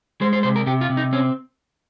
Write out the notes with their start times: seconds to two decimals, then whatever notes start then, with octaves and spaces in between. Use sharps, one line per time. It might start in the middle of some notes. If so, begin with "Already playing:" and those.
0.21 G#3 C5
0.33 C5
0.43 C3 C5
0.56 A#4
0.66 C3 G4
0.81 F4
0.90 C3
0.97 D#4
1.13 C4 C#4